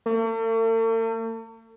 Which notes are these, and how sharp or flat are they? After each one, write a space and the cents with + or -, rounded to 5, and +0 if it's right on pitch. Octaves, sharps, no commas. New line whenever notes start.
A3 +45